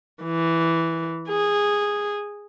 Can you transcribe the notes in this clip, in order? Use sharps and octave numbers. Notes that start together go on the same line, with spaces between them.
E3
G#4